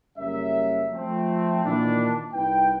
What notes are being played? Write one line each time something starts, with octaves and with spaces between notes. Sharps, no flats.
F#1 G3 C#4 A#4 E5
F3 A3 C4
A#2 D#3 E3 D4
C2 D#4 E4 B4 G5